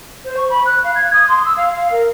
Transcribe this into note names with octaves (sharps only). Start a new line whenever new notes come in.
C5
C#6
B5
F#6
F5
G#6
D#6
C6
E6
F5
F5
A#4